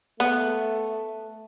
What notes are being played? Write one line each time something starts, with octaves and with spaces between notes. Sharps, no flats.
A3 B3